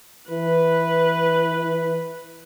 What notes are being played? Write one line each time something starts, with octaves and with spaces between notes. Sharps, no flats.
E3 B4